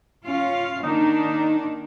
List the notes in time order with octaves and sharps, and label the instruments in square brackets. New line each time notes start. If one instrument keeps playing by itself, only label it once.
[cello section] C#4 F4 F5
[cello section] D#3 A#3 D4 [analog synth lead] D#4